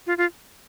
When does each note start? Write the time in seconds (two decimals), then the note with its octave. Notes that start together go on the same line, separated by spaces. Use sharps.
0.07 F4
0.18 F4